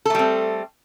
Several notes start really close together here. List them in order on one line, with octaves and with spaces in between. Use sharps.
A4 A3 G3 C4